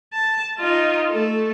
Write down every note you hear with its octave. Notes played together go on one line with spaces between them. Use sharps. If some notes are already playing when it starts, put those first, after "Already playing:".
A5
D#4 F4
A3 A4